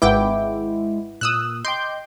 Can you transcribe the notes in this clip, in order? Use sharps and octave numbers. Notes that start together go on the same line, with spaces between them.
G#1 G#3 E4 B4 F#5 G5 D6
A#2 D#6 E6 F#6
D#5 G5 C6 D6 G6